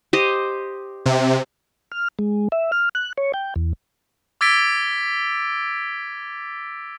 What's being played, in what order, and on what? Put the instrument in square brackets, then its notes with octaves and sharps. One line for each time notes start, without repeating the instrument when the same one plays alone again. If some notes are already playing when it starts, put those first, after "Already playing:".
[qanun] G4 C5 D#5
[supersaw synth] C3
[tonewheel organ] F6
G#3
E5
F6
F#6
C#5
G5
E2
[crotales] D6 E6 G#6 A6 B6 D7